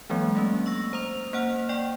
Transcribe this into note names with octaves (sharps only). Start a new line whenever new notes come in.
E3 F#3 G#3 A#3 C4
A3 A#3 C#4
C#6 E6 A#6
C5 A#5 D#6 F7
A#3 C5 F#5 F6
D5 G5 C#6